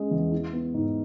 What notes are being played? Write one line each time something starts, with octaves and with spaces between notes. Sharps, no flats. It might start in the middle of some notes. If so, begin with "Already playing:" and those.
Already playing: G#3 C#4
E2
E4
B3
G#2